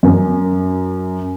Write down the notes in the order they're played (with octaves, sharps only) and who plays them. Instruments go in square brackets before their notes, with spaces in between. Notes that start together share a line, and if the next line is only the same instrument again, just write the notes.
[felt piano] F#2